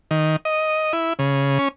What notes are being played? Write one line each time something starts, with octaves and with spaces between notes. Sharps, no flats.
D#3
D#5
E4
C#3
C#4